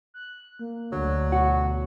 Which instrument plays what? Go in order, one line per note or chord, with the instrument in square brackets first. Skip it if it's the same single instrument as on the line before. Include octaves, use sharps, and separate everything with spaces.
[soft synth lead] F#6
A#3
[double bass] D2 [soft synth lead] D3 [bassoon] F#3
[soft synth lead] B2 [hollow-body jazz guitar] F#4